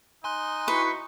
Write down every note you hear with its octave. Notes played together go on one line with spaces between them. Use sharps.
D#4 G#5 C6 F#6
E4 F#4 B4 C#6